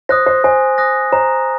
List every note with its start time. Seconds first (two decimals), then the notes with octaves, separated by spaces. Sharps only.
0.09 C5 D#6 F#6 A#6
0.26 C5
0.44 C5 G#5
0.78 D#6 F#6 A#6
1.12 C5 A#5